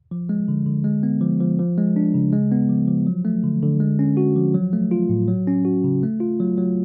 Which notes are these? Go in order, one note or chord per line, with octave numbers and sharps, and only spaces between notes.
F3
G#3
D3
D3
G#3
B3
F3
F3
F3
G#3
D4
C#3
G#3
B3
F3
F3
F#3
A3
D3
D3
G#3
C#4
F#4
F3
F#3
A3
F4
A2
F#3
C#4
F#4
C#3
A3
F4
F#3
F#3